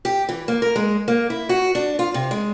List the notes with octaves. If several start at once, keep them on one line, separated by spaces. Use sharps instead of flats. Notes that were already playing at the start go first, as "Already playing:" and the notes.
G4
E3
A#3
A#4
G#3
A#3
E4
F#4
D4
F4
C3
G#3